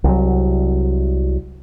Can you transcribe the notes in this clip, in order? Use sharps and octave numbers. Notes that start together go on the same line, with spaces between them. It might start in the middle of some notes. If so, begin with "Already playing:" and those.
C2 F#3